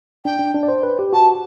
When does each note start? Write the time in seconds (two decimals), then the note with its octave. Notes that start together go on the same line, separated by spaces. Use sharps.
0.25 D4 G5
0.39 D4
0.55 D4
0.63 D5
0.68 C5
0.83 B4
0.99 G4
1.13 F#4 A5